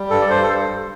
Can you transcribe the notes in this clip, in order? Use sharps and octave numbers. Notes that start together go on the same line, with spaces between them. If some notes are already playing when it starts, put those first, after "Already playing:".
Already playing: G3
G2 A4
D5
G2 C5
A4